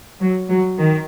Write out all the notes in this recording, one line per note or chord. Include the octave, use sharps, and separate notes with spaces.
F#3
F#3
D#3